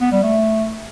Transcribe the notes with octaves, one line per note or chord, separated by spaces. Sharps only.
B3
G3
A3